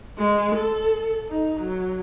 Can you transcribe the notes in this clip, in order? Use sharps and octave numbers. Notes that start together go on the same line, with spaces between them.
G#3
A4
D#4
F#3